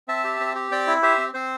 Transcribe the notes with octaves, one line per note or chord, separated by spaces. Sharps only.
C4 E5 A5
G4
C4
G4
C4 D5 G5
E4
G4 C5 E5
C4
C4 C5